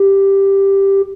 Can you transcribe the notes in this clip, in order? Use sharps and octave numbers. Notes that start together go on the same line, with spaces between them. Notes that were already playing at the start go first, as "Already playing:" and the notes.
Already playing: G4